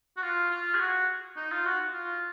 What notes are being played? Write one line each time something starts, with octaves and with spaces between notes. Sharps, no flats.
F#4
F4
F4
G#4
F#4
D#4
F4
F#4
F4